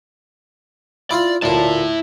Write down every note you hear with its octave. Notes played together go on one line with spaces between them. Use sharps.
E4 F4 D5
D2 A#2 E4 A5